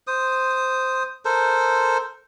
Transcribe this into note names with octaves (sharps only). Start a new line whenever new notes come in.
C5 D#6
A4 A#4 C5